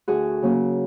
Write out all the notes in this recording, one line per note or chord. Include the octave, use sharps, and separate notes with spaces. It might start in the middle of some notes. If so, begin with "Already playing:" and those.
D2 F#4 G#4
C#3 F#3 A#3 C#4